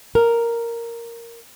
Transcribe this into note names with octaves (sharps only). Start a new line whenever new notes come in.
A#4